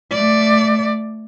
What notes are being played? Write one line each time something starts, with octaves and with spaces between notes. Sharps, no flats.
A3 D5